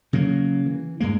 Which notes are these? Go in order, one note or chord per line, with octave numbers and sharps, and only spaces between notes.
C#3 F#3 A#3
E3
G2 G#3 A#3